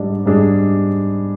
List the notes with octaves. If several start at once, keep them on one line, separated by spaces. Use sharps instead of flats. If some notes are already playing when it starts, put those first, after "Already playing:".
Already playing: G#2 G3 D4
G#2 G3 D4 G#4